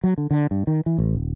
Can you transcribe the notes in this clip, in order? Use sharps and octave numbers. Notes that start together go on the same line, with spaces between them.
F#3
D3
D3
G2
D#3
E3
A1
D#1